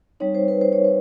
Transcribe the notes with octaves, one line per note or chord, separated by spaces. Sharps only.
G3 C4 D#4 C#5
C5
B4
C5
C#5
C5